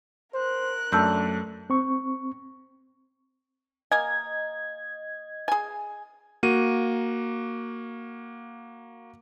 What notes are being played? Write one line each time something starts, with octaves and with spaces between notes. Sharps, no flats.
A#4 C5 F#6
F#2 A3 D4 A5 E6 G6
C4 C#6
A#3 D#5 G#5 G#6
G#4 G#5
A#3 F#4 D#7